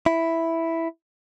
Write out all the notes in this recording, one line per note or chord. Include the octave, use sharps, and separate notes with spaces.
E4